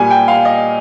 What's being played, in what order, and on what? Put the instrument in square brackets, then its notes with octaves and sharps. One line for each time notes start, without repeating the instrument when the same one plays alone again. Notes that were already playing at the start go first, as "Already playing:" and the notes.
Already playing: [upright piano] A#2 G3 G#5
G5
F5
D#5